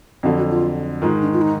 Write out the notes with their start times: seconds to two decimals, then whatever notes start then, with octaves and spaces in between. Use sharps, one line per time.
0.23 F2 D3 F#3 F#4
0.37 F#4
0.50 F4
1.02 G#2 D#3 G#3 F4
1.22 D4
1.33 F4
1.41 D#4